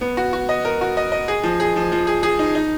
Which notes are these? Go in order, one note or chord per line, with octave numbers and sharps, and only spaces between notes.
B3
F#4
F#4
D#5
A#4
F#4
D#5
D#5
G#4
F3
G#4
F3
F3
G#4
G#4
D#4
D#4